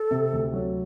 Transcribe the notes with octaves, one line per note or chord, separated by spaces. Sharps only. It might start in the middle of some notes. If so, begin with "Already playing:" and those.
Already playing: A4
C3
D2
F#3